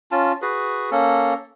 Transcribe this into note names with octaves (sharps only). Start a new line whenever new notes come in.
C#4 F4 A5
F#4 G#4 B4
A#3 C#4 A4